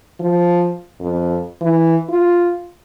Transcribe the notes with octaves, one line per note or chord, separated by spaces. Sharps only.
F3
F2
E3
F4